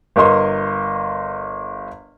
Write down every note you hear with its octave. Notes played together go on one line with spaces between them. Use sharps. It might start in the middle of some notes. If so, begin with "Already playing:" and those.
G1 A#4 D#5 C6 C#6